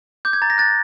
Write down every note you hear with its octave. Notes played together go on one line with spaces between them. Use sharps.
D6 G6
G#6
A#5 A6
A#6
F#6 A6